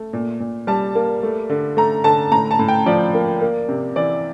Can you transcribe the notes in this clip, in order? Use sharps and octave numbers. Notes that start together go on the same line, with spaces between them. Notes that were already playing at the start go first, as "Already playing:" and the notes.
Already playing: A3
A#2
A#2
G3 A5
A#3
A3
D3
A3 A#5
D3 A5
A2 A#5
A5
A2
G5
F3 D5
A#3
A#3
C3
E3 D5